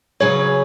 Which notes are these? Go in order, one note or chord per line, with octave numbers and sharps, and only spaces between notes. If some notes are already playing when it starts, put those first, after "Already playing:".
C#3 F#3 C#4 G#4 B4 C#5